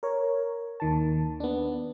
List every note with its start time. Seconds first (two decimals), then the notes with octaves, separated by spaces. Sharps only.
0.03 A#4 C#5
0.80 D#2 D#3 A5
1.40 B3 D4